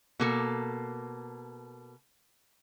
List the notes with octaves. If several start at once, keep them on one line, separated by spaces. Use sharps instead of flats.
B2 A#3 A4